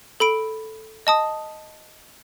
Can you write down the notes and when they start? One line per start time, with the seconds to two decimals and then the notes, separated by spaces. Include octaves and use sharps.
0.20 A4 B5 D7
1.07 D#5 A5 D#6